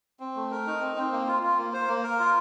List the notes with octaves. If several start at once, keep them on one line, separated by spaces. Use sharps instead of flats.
C4
A3
A#4
D#4
C4
C4
A#3
F4
F4
A#3
C5
A#3
A#4
F4